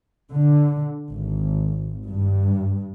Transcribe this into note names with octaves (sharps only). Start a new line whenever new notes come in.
D3
G#1
G2